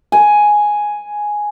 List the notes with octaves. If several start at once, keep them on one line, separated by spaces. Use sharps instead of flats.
G#5